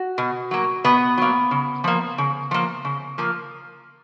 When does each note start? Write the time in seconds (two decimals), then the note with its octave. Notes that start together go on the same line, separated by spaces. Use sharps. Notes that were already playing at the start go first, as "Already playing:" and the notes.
Already playing: F#4
0.18 B2
0.51 F#3 A#3
0.84 B2 B3
1.18 F#3 A#3
1.51 C#3
1.84 F3 A#3
2.18 C#3
2.51 F3 A#3
2.85 C#3
3.18 F3 A#3